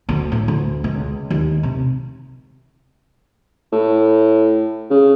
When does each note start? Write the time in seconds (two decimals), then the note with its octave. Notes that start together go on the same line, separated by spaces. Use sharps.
0.09 D2
0.32 A2
0.48 D2
0.84 C#2
1.30 D#2
1.63 C3
3.72 A2
4.90 C#3